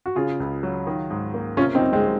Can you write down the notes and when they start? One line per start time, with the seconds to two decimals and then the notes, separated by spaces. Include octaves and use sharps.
0.06 F#4
0.16 C#3 F4 G#4
0.40 C#2
0.63 F#3
0.87 D#3
1.11 G#2
1.34 A#3
1.57 C3 C#4 F4
1.75 C4 D#4
1.80 C2
1.93 G#3 C4
2.04 F#3